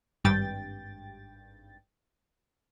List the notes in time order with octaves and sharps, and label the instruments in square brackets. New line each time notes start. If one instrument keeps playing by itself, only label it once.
[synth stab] G#1 G2 G5 A6